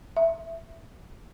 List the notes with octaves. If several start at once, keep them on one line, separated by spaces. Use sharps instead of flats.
E5